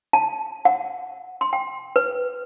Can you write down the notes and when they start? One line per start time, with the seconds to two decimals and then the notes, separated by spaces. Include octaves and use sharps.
0.13 A5
0.65 F#5
1.41 C6
1.53 G5
1.96 B4